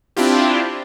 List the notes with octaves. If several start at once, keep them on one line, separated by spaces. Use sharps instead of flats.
C4 D4 E4 F4 G4